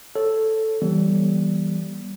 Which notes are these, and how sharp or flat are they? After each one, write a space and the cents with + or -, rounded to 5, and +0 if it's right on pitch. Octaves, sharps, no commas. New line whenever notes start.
A4 +0 C#5 -10
E3 +0 G3 -10 B3 -45